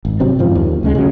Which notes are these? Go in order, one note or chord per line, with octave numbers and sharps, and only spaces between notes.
G#1
C3 F#3 C4 D4
G#1 F#2 F3
D#2
D2 C#3 G#3
C#3 F#3